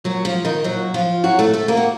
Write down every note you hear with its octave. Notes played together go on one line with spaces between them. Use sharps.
A#2 F#3 F#4
F3 F4
D#3 D#4
A#2 F#3 F#4
F3 F4
A2 F#3 F#4
A3 A4
A3 A4
A#3 A#4
F#4